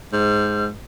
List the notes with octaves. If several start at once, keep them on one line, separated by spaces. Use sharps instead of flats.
G#2